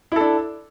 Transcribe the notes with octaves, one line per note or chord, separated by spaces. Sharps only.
D4 E4 A4